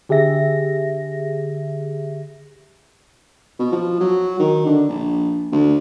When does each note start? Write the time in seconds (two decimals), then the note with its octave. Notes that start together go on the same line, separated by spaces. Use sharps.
0.09 D3 G4 G#4 E5 A#6
3.59 B2
3.72 F3
4.01 F#3
4.39 D#3
4.66 D3
4.89 A#1
5.52 D2